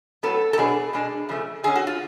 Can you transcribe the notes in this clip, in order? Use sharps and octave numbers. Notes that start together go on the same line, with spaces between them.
A2 F#3 B3 A4
A4
B2 F#3 B3 D4 G#4
B2 G#3 D4
C#3 F3 A3
D3 G#3 C#4 G#4
F#4
F4